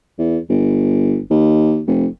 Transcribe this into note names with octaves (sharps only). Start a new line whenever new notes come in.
E2
G1
D#2
F1